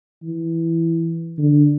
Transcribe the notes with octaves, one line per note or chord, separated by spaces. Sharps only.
E3
D3